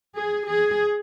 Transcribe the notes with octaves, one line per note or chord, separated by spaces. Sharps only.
G#4
G#4